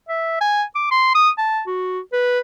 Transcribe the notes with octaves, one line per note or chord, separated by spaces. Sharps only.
E5
G#5
D6
C6
D#6
A5
F#4
B4